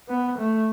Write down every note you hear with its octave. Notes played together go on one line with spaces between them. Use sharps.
B3
A3